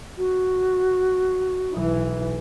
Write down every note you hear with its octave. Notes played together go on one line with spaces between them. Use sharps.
F#4
B1 E3